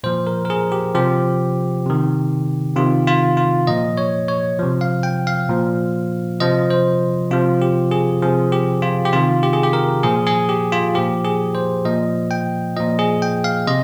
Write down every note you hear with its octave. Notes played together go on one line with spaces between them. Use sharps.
A#2 F3 C5
A#4
A#4
G#4
G4
C3 F3 G4
C3 D#3
C3 D#3 F4
F4
F4
A#2 F3 D#5
C#5
C#5
C3 F3
F5
G5
F5
A#2 F3
C3 F3 D#5
C5
C3 F3 F4
G4
G#4
C3 F3 G#4
G4
F4
G4
C3 D#3 F4
G4
G#4
G4
A#4
A#2 F3 G#4
G#4
G4
F4
A#2 F3 G4
G#4
C5
A#2 F3 D#5
G5
A#2 F3 D#5
G#4
G5
F5
C3 D#5